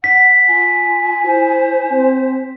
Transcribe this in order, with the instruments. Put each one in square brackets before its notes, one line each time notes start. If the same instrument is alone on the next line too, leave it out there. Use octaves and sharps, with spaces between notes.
[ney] F#5 [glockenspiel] B6
[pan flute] F4 [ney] G#5
[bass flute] E4 [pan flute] C5
[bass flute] C4